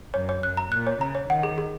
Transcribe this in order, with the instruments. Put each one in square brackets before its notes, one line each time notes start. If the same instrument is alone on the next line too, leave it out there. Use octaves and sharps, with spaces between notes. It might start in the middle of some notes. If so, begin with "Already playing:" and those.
[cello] F#2 [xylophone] C#5
[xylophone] C#5
[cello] F#2 [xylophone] F#6
[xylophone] A#5
[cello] A#2 [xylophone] F#6
[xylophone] C#5
[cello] C#3 [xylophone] A#5
[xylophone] C#5
[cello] D#3 [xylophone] F#5
[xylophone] G#4
G#4